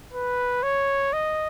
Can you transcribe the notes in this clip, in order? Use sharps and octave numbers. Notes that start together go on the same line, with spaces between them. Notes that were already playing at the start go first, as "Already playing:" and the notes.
B4
C#5
D#5